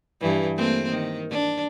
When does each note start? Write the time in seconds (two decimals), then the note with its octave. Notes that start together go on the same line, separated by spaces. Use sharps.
0.21 G2 E3
0.57 A3 A#3 C4
0.90 D#3
1.30 D4